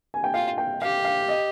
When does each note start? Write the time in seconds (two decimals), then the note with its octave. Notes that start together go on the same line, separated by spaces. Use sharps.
0.14 G#5
0.24 G5
0.34 F4 F5
0.58 G5
0.82 G4 F5
1.04 F5
1.28 D#5